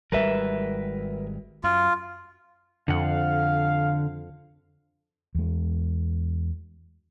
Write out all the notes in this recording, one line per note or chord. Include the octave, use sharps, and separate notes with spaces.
G#1 G3 G#3 A#4 B4 E5
F#2 F4
F2 D3 F5 F#5
E2 G#3